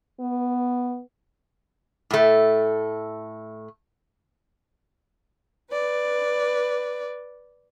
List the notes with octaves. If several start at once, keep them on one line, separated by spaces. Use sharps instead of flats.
B3
A2 A3
B4 D5